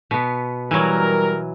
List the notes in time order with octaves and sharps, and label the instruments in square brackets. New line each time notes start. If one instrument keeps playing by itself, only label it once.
[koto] B2 B3
[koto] E3 F#3 [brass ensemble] G3 A#4